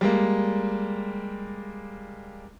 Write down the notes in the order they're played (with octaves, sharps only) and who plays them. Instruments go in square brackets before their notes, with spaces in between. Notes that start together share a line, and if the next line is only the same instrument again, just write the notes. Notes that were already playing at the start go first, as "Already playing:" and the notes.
[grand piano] G3 G#3 A#3